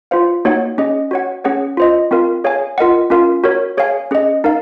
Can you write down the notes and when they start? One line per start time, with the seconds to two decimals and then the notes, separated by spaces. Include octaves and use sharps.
0.11 F4 C5 F5
0.45 A#3 D#4 F#4 C#5 F#5
0.78 C#4 G#4 D#5
1.11 F#4 C#5 F#5
1.44 C#4 G#4 C#5 F#5
1.77 F4 C5 D#5
2.11 C4 F4 A#4 F5
2.44 G#4 C#5 F5 G#5
2.78 F4 A#4 D#5 F#5
3.10 C#4 F4 A#4 F5
3.44 F#4 A#4 C#5
3.77 G#4 C#5 F5 G#5
4.11 C#4 G#4 D#5
4.44 D#4 A#4 F5